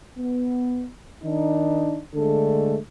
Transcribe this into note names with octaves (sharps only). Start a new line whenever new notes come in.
B3
D#3 D4 D#4
D3 G#3 A3 D4 A4